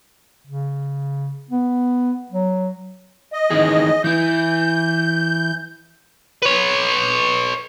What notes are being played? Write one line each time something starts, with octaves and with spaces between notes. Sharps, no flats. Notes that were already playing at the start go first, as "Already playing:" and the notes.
C#3
B3
F#3
D#5
D#3 E3 G#4
E3 E4 G6
B4 C#5